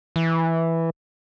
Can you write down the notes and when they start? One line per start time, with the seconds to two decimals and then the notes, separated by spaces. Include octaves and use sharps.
0.16 E3